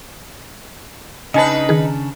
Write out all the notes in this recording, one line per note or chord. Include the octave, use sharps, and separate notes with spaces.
C#3 D4 D#4 B4 D#5 G#5 A5
D#3 G#4